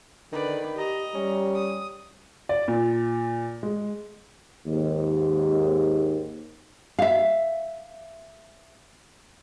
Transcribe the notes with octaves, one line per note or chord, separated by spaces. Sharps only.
D3 D#3 B4 D5
G4 D#5 A#5
G3 C#4
D#6
D5
A#2
G#3
D#2 G#2
E5 F5